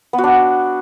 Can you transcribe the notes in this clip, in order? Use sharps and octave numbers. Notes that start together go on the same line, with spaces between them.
B3
F#4
D4